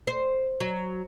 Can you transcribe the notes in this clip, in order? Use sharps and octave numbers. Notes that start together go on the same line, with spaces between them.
C5
F#3